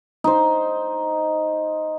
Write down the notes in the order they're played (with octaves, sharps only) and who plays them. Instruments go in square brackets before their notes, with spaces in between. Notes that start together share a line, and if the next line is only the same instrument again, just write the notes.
[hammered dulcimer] D#4 C5